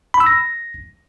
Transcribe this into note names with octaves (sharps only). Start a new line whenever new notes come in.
B5
E6
A#6